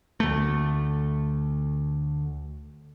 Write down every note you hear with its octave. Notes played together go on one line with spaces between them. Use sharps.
D2 A3